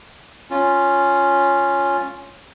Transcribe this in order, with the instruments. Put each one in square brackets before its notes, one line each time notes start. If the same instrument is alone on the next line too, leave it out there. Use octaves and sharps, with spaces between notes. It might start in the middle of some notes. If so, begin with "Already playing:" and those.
[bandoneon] C#4 F4